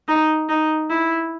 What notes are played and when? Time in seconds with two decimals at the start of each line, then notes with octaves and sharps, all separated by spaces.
0.08 D#4
0.49 D#4
0.90 E4